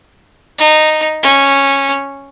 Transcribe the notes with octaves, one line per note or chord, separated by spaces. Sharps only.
D#4
C#4